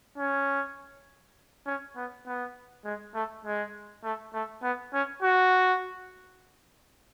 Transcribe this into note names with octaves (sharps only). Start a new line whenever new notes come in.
C#4
C#4
B3
B3
G#3
A3
G#3
A3
A3
B3
C#4
F#4